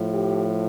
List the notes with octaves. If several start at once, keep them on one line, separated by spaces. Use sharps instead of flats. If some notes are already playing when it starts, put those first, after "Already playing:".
Already playing: A2 F3
G4